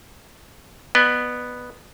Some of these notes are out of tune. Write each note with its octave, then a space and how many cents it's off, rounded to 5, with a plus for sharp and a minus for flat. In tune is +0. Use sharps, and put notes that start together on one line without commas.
B3 +0 D5 +45